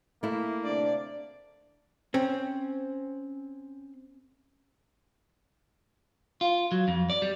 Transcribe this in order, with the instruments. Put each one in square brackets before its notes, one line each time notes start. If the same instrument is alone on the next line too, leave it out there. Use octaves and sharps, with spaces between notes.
[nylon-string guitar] A3 E4 [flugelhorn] A#3
[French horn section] D2 C3 D4 [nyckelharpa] D5
[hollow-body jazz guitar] C4 C#4
[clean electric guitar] F4
F#3
F2
D5
G3